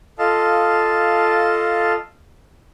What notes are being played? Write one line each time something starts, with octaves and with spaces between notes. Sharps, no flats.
F4 A4 D#5 F5 A5